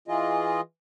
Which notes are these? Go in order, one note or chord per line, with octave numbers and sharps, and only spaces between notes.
E3 F4 G#4 D#5